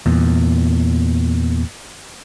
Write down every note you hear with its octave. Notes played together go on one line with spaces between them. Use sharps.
E2 A#2